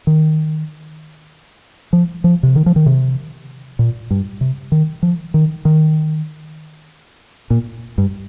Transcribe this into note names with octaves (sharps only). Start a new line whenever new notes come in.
D#3
F3
F3
C3
D#3
F3
D#3
C3
A#2
G2
C3
D#3
F3
D#3
D#3
A#2
G2